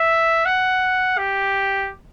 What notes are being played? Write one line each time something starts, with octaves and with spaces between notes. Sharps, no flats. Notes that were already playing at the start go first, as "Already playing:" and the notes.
Already playing: E5
F#5
G4